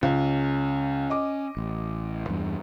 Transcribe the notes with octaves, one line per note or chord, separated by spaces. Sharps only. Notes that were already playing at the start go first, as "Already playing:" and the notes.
C#2 C#4
D#5 D6
A1
E2 G2